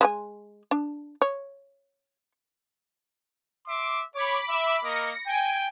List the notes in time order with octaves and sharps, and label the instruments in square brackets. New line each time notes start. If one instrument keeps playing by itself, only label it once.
[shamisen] G#3 B4 G#5
D4
C#5
[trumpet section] E5 C6 D6
[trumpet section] C#5 [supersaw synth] B5 D6
[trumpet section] E5
[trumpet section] A#3 A#4 D#5 [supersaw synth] A#6 C#7
[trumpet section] G5 [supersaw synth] G#5